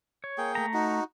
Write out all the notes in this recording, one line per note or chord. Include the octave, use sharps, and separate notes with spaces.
C#5
A#3 G#4 G5
A3 A#5
D#4 F#4